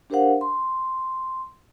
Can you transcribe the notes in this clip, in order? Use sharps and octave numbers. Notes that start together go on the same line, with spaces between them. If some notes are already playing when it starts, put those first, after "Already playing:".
D4 G4 A#4 C5 F5 F#5
C6